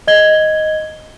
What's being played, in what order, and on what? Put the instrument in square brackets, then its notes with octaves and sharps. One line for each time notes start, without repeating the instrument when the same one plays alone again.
[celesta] D#5 G#6 G7